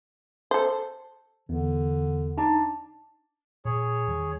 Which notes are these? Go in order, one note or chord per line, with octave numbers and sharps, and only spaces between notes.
A4 C5
E2 D3
D4 D#4 A5 A#5
A#2 G#4 C#5
E2 D#3 G3